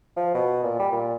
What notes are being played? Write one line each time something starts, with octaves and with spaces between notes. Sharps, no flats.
F3
B2
A#2
G3
A#2